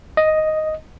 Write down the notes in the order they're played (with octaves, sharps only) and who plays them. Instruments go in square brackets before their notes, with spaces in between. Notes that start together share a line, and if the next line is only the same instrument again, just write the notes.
[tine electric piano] D#5